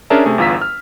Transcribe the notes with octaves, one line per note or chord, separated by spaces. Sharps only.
C#4 D4 G#4 A#4 E5 A5
C3 A3 G#4
G1 E2 F4 A#5 E6 B6
F6